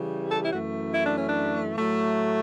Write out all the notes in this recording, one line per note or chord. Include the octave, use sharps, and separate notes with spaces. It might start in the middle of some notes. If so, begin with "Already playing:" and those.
Already playing: C#3 E3 G3
A4
E4
F#2 E3 A3 F#4
E4
D4
C#4
D4
A2 F#3 A3